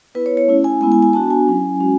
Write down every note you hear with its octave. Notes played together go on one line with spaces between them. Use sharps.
B3 E4 B4
C#5
C#5
A3 C#4 E4
G#5
G#3 B3 E4 G#5
G#5
G#5
B3 D4 F#4 A5
G#5
F#3 C#4 E4
G#3 C#4 F#4